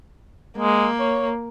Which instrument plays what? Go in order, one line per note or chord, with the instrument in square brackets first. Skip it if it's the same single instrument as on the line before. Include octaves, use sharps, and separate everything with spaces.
[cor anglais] G#3 [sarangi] A#3
[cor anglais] C#5